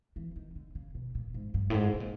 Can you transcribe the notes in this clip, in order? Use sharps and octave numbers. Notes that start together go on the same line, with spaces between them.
E3
D#3
D3
C#3
B2
A#2
G#2
G2
A2
G#2
B2
A#2